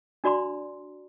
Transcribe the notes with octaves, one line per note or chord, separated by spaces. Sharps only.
D4 F#4 D5 A#5 C6